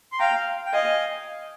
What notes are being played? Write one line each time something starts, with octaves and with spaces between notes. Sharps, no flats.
C6
F5 G5 A#5
G5
D#5 F5 G#5